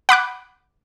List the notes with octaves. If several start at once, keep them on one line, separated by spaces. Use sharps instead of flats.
F#5 B5 D6 F#6